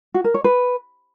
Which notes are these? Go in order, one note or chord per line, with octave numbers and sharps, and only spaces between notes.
F#4
A#4
C#5
B4